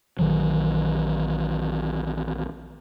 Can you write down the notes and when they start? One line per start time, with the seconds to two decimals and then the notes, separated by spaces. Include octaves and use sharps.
0.19 A#1 D#3 E3 F#3